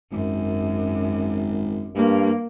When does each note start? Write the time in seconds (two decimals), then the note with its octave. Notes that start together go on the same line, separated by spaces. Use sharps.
0.11 G#1 F#2
1.95 G2 A#3